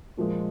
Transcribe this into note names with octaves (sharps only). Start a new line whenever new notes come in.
A#2 F3 G#3